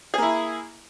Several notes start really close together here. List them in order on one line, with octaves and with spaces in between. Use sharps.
G#4 A#3 E4